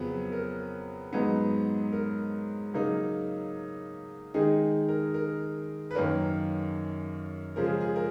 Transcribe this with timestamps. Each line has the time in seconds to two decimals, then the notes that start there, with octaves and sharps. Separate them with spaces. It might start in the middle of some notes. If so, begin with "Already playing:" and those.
Already playing: F2 C#3 F#3 B3 B4
0.32 A#4
1.13 G#2 F#3 B3 D#4
1.93 A#4
2.74 C#3 F#3 A#3 D#4
4.34 D#3 G#3 D#4 G#4
4.88 A#4
5.14 A#4
5.91 B4
5.95 F#2 D#3 A#3 C#4 A#4
7.56 C#3 F3 G#3 A#4
7.64 G#4
7.80 G#4
7.96 A#4